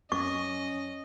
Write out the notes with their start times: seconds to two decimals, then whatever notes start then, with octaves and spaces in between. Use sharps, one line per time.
0.12 F#2 C#4 D#5 C#6